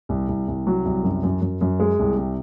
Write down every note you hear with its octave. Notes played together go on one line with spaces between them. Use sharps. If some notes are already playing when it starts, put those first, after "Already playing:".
C2
C2
C2
F#3
C2
F#2
F#2
F#2
F#2
G#3
C2
C3